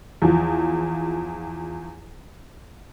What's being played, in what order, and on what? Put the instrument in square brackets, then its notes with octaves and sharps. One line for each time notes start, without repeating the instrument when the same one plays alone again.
[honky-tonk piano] E2 F3